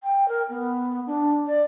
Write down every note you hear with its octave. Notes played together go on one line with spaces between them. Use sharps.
G5
A#4
B3
D4
D5